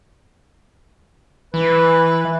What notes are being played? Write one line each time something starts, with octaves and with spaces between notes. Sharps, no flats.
E3 B4